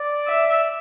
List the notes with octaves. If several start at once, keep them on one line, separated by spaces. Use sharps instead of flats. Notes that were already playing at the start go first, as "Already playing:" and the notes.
Already playing: D5
E5